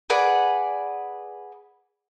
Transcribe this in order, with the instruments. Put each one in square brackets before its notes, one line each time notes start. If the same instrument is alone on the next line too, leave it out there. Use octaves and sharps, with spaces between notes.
[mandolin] G#4 B4 D5 F#5